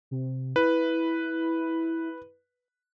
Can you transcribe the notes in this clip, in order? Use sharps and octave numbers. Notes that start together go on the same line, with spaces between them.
C3
E4 B4